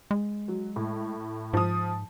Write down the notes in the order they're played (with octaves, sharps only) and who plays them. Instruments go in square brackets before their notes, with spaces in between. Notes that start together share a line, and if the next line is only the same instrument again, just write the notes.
[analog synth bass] G#3
[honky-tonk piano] F#3
A2
[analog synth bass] G#2 [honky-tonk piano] F3 D#6